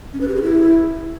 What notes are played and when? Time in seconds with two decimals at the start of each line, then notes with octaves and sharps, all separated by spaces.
0.13 C#4
0.21 B4
0.28 G4
0.35 G#4
0.42 E4